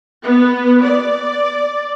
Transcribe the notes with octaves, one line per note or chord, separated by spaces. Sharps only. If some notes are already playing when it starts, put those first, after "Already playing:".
B3
D5